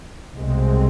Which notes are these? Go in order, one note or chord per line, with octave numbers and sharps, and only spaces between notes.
C2 B2 G#3 C4